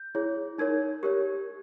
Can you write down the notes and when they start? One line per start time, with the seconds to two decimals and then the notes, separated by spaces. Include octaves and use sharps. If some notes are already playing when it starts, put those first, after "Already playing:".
Already playing: G6
0.15 E4 G#4 C#5
0.58 D#4 A#4 C#5 G#6
1.03 G4 A#4 C#5